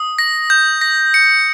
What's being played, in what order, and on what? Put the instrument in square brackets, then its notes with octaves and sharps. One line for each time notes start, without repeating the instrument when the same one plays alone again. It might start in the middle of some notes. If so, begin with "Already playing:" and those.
Already playing: [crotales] D#6
A#6
G6
A#6
C#7